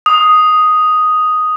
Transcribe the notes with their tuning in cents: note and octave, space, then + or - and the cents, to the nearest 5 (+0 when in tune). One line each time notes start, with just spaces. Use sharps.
D#6 +0